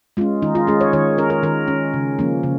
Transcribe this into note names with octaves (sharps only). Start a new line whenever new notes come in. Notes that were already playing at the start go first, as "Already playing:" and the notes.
G#3 C#4 F4
D#3 D#4
F4
G#3 C#4 G#4
C#5
D#3 C#5
C#4 A#4
A#4
D#3 A#4
C#4
C#3
F3 A#3 C#4
C#3